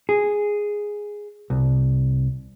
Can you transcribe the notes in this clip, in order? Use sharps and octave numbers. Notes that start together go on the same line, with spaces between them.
G#4
C2